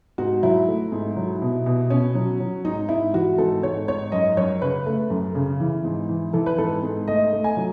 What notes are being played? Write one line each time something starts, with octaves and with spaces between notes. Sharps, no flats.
G#2 F#4
F#3 E4
A3
G#2
F#3
B2
B2
B2 C#4
F#3
F#3
G#2 D#4
G#2 E4
E3 F#4
G#2 A4
G#2 C#5
G#2 C#5
F#2 D#5
F#2 C#5
C#3 B4
A3
F#2
C#3
E3
G#2
E3
E3 A4
B4
G#2 A4
G#2
A3 D#5
A3
G#5
F#3